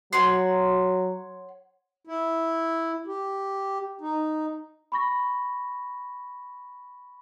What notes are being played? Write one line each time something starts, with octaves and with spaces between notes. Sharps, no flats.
F#3 C#5 F#5 C6
E4
G4
D#4
B5 C#6 A#6